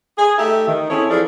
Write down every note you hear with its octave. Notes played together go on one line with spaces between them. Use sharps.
G#4
A3 D#4 G4 E5
D#3
C4 C#4 E4 G#4 A4 C#5
E3 F3 G#4 A4 D5